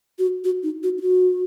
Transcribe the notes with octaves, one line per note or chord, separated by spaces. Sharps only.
F#4
F#4
D#4
F#4
D#4
F#4